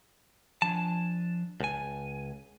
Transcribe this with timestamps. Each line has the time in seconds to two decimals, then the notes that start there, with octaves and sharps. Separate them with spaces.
0.62 F3 D4 G#5 A5
1.60 C#2 G#5 A5